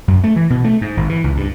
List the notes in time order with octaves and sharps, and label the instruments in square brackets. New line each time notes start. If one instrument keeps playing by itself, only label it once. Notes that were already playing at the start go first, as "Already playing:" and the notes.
[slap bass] F#2
A3
E3
B2
A3
G#2
G#1
E3
C#2
G2